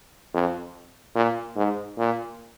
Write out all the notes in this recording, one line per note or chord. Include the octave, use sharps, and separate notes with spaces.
F2
A#2
G#2
A#2